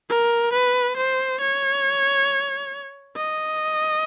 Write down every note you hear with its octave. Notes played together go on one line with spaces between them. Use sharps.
A#4
B4
C5
C#5
D#5